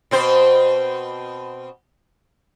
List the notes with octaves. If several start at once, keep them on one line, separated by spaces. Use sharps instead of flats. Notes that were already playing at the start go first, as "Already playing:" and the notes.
B2 C4 C5